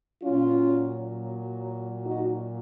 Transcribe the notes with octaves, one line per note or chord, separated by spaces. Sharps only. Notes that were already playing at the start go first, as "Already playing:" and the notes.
A#2 F#3 C#4 F4
D#4 F#4